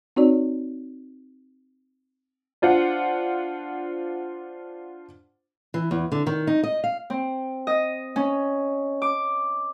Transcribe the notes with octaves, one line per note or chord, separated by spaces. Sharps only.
C4 D#4 F#4 C#5 D5
D4 F4 C5 F#5
E3
E2
D3
D#3
D#4
D#5
F5
C4
D#5
C#4
D6